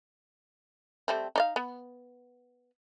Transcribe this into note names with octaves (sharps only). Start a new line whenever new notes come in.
G3 A3 C4
D#4 D5 F5
B3